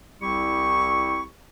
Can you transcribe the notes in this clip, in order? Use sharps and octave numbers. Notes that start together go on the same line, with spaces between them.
C2 G3 C4 E4 G4 C#6